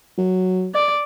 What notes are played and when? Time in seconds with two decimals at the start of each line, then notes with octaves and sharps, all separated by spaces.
0.18 F#3
0.74 D5